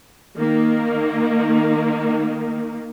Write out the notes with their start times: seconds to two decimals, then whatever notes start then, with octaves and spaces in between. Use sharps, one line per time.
0.38 D#3 A#3